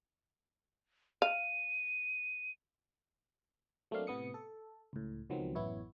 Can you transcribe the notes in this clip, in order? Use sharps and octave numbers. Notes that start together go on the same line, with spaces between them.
F5 D#7
F#3 A3 A#3 C4 D4 F5
A2 C3 B3 D#6 C#7
A4
C#2 A2
C#2 D#3 F3 F#3 B3 C4
A1 F#2 B3 E4 C#5